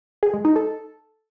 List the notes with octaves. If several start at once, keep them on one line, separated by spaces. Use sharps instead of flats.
G#4
G#3
D#4
A4